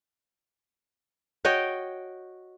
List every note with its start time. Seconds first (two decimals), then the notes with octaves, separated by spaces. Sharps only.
1.45 F#4 C#5 D#5 G5